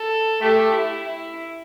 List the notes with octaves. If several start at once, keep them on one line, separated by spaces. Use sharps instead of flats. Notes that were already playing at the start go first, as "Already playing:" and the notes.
Already playing: A4
A3 G4
E4
E4